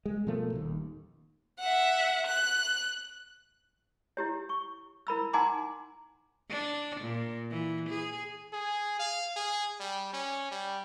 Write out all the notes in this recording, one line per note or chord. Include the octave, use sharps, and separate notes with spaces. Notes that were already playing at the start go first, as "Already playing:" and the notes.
G#3
B2 F3 A3 A#3
D#1 D#2
E5 F#5
F#6
E4 G4 C#5
C#6
E4 A#4 B5 E6
D#4 F#5 G#5 A#5 C6 D6
D4
A#2
E3
G#4
G#4
F5
G#4
G3
C#4
G3